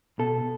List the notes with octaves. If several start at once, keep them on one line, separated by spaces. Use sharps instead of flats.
B2 A4